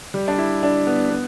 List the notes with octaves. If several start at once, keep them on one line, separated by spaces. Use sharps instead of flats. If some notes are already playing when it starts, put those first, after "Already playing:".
G3
D4
E4
D4
B3
B3